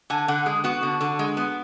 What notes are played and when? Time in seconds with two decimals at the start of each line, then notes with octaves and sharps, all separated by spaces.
0.10 D3 G#5
0.28 D3 F#5
0.46 G#3 G#4
0.64 B3 F#4
0.83 D3
1.01 D3
1.19 G#3
1.37 B3